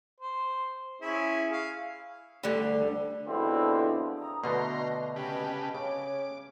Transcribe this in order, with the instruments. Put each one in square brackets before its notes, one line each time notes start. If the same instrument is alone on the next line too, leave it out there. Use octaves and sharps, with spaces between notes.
[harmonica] C5
C#4 E4 G#4
F5
[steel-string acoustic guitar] D2 [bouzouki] D3 G3
[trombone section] E2 B2 D3 F3 C4 E4
[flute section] A#5 D#6
[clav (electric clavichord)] B2 D3 A3 [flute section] B4 D#5 [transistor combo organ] A#5 C6
[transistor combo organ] C#3 G4 B4 [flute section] D#5 G5 A5
[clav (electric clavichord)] C#3 [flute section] C#5 [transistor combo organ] D6